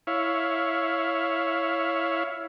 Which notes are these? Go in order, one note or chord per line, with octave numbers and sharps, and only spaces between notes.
E4 C#5 F5